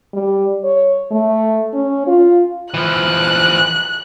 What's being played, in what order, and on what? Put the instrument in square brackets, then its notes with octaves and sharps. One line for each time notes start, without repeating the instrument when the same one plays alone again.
[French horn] G3
C#5
A3
C#4
F4
[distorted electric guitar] E3 F3 [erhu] F#6